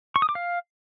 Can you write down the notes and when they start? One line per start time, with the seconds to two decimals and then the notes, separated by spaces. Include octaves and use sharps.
0.16 C#6
0.22 D#6
0.29 D6
0.35 F5